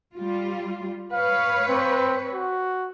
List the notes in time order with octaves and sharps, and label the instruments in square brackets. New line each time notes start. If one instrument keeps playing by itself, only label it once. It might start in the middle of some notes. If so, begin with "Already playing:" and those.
[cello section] G3 F4
[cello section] B4 C#5 [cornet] F5
[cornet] C4
F#4